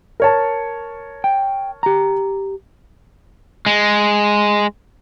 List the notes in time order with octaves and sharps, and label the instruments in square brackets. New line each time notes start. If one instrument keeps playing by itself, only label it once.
[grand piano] A#4 C#5 A5
[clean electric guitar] G5
G4 A#5
[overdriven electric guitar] G#3